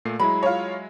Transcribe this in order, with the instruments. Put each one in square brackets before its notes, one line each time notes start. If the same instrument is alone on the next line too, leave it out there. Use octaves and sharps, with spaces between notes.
[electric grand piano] A#2 A3 C7
[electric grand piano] F#3 G#3 E4 [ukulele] B5
[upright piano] F4 C#5